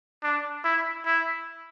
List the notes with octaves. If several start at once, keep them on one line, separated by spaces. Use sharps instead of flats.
D4
E4
E4